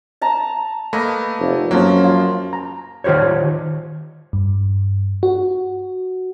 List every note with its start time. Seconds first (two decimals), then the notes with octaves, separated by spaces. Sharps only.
0.21 A5 A#5
0.93 A3 A#3 B4 D#5
1.39 F1
1.71 F#2 F3 F#3 A#3
2.04 F4
2.53 A#5
3.04 D#3 F4 G4 C5 C#5
4.33 G2
5.23 F#4